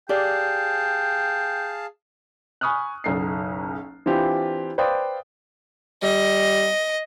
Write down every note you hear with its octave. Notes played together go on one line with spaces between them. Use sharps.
G4 G#4 D5 F5 G5 A5
G#5 B5 C#6 D#6 F6 F#6
F#1 B1 C7
E3 C4 D4 E4 F4 G4
B4 C5 D5 F5 G5 D#6
G3 D#5